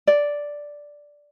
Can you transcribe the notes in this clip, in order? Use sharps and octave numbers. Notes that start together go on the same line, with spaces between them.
D5